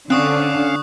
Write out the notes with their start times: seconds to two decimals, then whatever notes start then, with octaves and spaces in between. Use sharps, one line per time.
0.10 D3 C4 C#4 F5 C#6 D#6 F#6